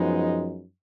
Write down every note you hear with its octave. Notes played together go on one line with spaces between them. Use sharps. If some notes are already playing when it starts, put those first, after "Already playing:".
Already playing: F#2 F3 G#3 B3 D#4